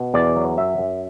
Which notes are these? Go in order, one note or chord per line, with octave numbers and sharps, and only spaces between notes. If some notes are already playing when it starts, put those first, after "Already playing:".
Already playing: B2
E2 D5
F#3
F#2 E5
F#2